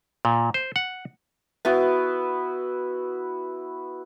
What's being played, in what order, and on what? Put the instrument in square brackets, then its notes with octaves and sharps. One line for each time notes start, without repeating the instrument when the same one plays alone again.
[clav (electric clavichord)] A#2
C5
F#5
[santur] B3 E4 F#4